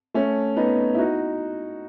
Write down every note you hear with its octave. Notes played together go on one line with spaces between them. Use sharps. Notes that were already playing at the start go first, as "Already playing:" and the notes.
A3 C#4
B3 D#4
E4
D#4 F#4